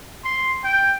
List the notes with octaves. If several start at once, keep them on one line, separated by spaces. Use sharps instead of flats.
C6
G5